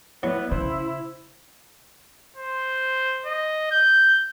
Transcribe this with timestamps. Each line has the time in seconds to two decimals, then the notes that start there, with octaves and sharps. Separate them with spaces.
0.23 F#3 B3 E4 D5
0.51 C#3 E4 C5
2.36 C5
3.26 D#5
3.71 G6